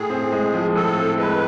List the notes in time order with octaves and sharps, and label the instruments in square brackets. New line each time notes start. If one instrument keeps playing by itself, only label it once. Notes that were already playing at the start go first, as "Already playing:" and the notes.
Already playing: [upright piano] A2 [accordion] G#4
[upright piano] C4
G#3
F3
[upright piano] A2 [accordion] A4
[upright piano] C4
[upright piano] G#3 [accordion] B4